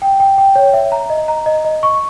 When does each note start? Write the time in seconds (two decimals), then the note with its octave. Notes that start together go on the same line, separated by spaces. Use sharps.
0.02 G5
0.20 G5
0.38 G5
0.56 C#5
0.74 E5
0.92 A#5
1.10 D#5
1.28 A#5
1.46 D#5
1.65 D#5
1.83 C#6